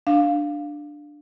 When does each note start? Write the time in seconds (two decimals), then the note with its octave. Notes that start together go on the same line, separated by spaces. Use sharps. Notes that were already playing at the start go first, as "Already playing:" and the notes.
0.07 D4 F5